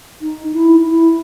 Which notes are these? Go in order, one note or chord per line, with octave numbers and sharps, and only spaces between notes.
D#4
E4
E4